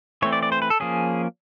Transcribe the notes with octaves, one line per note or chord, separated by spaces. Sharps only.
E3 A3 C4 C#5
D5
D5
C5
B4
A4
F3 A#3 C#4 G#4